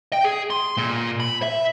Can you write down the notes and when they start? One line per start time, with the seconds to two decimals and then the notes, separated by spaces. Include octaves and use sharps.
0.13 G5
0.24 G#4
0.50 C6
0.77 A#2
1.20 B5
1.42 E5